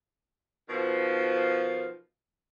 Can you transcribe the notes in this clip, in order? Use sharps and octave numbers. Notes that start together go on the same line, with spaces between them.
B2 D#3 F3